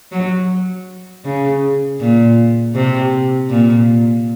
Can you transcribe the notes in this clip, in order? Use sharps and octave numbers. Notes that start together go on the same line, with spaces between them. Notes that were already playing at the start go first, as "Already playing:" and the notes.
F#3
C#3
A#2
C3
A#2